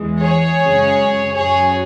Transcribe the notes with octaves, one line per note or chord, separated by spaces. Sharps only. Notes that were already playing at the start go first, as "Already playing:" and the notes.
Already playing: E2 E3 G#3
G#4 C#5
F#2 C#3 G#3
F#2 F#3 G#4 C#5